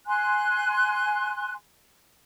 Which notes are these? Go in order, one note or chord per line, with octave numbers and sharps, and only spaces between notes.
G#5 C6 F#6